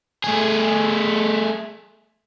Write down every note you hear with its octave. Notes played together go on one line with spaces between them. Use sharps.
A3 G#4